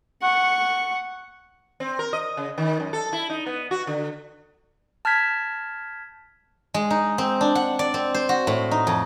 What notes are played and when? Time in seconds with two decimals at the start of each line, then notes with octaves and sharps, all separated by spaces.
0.22 F#5 C#6
1.80 C4
1.99 A#4
2.13 D#5
2.37 C#3
2.58 D#3
2.80 F#2
2.93 A4
3.13 E4
3.30 D#4
3.46 B3
3.71 F#4
3.87 D3
5.05 A5 F6 G6 G#6 B6
6.74 G#3
6.90 D#4
7.18 C4
7.41 D4
7.55 F#5
7.79 D5
7.94 C4
8.14 C5
8.29 F#4
8.47 A2
8.71 D#4
8.87 F2